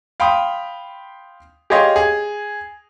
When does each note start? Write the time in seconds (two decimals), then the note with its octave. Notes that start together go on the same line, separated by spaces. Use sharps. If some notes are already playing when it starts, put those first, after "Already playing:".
0.20 F5 G5 B5 C6 D#6
1.70 G4 G#4 C#5 D#5 F5 C6
1.96 G#4